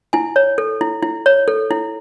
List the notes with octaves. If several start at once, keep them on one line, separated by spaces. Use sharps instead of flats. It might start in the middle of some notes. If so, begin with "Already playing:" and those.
E4 G#5
C#5
A4
E4
E4
C#5
A4
E4